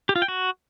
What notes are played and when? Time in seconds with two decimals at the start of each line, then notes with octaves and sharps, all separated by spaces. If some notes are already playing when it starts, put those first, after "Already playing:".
0.09 G4
0.16 F4
0.22 G5
0.28 F#4